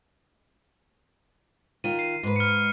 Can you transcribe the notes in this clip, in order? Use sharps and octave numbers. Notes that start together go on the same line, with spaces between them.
D#3 F4 D#7
C7 D#7
G#2 B4
F6 C#7